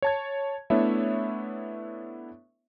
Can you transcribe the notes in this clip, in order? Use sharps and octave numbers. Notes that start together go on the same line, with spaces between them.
C#5 A5 G#6
A3 B3 D4 E4 C#5 E5